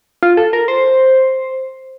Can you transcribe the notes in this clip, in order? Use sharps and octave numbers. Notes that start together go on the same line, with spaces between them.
F4
A4
A#4
C5